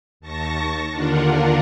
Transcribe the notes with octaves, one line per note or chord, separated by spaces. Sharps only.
D#2 A5 C#6 A#6
D#2 D3 D4 F4 A#4 F#5